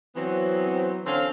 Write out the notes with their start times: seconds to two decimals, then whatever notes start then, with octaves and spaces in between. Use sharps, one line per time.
0.16 E3 F#3 B3 C4
1.07 D3 C4 C#4 F5